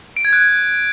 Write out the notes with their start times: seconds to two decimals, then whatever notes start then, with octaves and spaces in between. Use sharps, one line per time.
0.17 D7
0.25 G#6
0.33 F#6